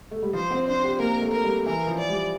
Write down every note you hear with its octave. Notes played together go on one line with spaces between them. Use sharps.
A3
G3
F3 C5
C4
D4 C5
G4
A#3 A#4
A3
A#4
G3
E3 A#4
F3
D5
G3